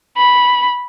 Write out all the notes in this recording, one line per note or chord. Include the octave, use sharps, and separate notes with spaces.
B5